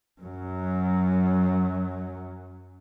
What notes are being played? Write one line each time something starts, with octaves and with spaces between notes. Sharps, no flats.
F#2 F#3